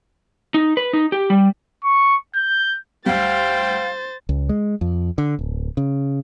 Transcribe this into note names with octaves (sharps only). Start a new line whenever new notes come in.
D#4
B4
D#4
G4
G3
C#6
G6
D2 G3 C5 F5 G5 A6
C#2
G#3
F2
D3
D1
C#3